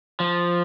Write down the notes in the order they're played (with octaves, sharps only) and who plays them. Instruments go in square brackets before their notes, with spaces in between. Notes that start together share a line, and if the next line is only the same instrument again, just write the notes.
[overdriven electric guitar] F3